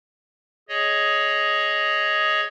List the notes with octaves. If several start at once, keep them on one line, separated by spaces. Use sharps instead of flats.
G#4 C#5 D#5